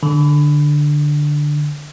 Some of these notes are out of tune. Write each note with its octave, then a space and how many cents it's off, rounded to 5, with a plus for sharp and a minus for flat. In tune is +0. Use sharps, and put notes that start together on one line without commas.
D3 +5